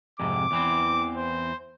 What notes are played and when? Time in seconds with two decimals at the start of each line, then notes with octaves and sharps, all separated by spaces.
0.20 F2 G#2 C3 D6
0.51 E2 E3 C4
1.17 C5